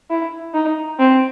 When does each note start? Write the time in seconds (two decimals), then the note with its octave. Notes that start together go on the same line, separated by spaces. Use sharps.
0.10 E4
0.54 D#4
0.99 C4